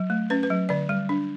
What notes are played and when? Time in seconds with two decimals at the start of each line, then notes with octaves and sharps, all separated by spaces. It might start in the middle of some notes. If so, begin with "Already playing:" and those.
Already playing: F#3
0.10 A3
0.30 C#4 B4
0.43 B4
0.50 F#3
0.69 D3 D5
0.89 G3
1.09 D4